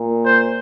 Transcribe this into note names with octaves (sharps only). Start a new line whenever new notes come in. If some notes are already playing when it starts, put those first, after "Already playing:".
Already playing: A#2
C5